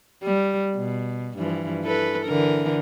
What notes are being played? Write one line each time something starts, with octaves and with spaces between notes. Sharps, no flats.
G3
B2
G2 E3 F3
E3 A4 B4
D3 E3 A#4